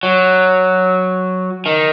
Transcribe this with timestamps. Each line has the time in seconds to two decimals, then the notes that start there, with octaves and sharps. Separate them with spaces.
0.03 F#3
1.66 D#3